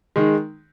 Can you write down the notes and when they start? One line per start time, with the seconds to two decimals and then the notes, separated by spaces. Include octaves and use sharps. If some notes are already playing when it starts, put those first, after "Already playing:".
0.16 D#3 G#3